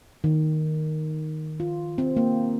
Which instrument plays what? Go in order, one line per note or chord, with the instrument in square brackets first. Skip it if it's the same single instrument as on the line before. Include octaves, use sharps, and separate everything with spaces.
[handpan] D#3
F4
C4
A#3